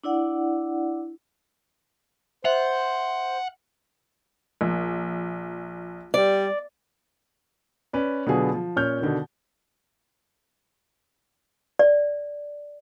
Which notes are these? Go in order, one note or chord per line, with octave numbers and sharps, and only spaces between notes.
D4 E4 D5 F#5
C5 E5 F#5
A#1
G3 D5
C#4 B4 D5
B2 D3 F#3 B3 F4 G#4
F3
A#2 C#4 C#5 F6 G6
B2 D3 D#3
D5